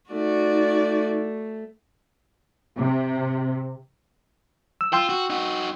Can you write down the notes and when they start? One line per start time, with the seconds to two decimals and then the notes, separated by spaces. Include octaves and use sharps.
0.10 A3 D#4 F#4 D5
2.76 C3
4.81 E6
4.93 F4 G5 C6 E6
5.09 F#4
5.30 D#4 F#4